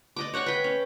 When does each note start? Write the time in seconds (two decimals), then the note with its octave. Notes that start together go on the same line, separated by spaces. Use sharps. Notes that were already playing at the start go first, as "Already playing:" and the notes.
0.16 D5 D#5 D6
0.34 C#5 F#5 G5 C#6
0.46 B4 G5
0.64 C#4